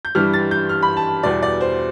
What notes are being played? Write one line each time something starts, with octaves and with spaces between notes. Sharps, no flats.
G6
G2 E3 G3 F6
A6
G6
F6
B5
A5
E2 B2 G3 D5
D5
C5